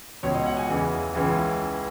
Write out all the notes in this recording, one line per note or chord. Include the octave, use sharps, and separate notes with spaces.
C#2 B2 C#5
D#5
F#5
G#5
E2 C#3 E3
C#2 C#3 E3